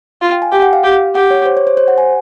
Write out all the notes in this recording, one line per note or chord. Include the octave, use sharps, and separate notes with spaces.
F4 F5
G5
G#5
G4 G5
F#5
F5
G4
G4 F#5
C#5
C5
C#5
C5
C5
F#5
G#5